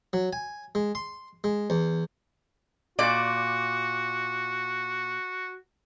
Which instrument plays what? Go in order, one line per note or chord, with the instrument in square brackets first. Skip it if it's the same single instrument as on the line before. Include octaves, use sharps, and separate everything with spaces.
[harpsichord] F#3
G#5
G#3
C6
G#3
E2
[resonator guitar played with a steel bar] A#2 D5 [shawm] F#4